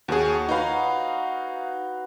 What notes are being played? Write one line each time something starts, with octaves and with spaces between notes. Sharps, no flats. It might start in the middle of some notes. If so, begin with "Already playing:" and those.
D#2 F#4 G#4 C#5 F#5
D#4 F#4 B4 F5 A#5